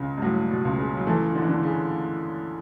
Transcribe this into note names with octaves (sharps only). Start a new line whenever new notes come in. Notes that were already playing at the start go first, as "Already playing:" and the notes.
Already playing: C#2 C#3
G2
A2 F#3
B2
C#2
C#3
F#3
E3 A3
D3
E3
D3 D4
C#3